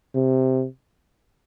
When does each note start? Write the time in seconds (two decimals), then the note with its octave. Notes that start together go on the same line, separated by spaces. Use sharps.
0.15 C3